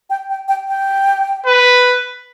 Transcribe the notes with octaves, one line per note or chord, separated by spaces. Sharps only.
G5
G5
G5
G5
B4